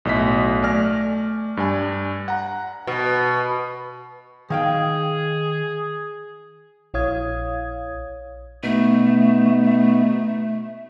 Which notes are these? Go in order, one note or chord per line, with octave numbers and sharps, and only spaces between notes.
B1 A2 D#5 E5 B6
A3 D5 G#5 F6 A#6
G2 D5 G#5
F#5 A#5
B2
D#3 G#4 F5 G5
A#1 E4 C#5 F5 D#6 G#6
B2 A3 B3 D#4